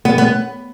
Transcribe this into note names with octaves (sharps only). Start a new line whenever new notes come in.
B3
B3